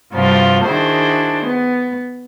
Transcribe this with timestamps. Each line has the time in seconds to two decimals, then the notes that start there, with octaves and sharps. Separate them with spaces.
0.13 G2 C3 F3 G3 F4 F#4
0.65 D#3 D4 E4 F#4 G#4 C5
1.46 B3